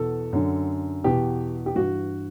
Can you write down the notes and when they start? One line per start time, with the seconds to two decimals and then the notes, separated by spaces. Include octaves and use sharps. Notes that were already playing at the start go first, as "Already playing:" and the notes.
Already playing: E2 B2 A4
0.33 F#2 D3
1.04 E2 B2 G4
1.66 G4
1.75 G2 E3 F#4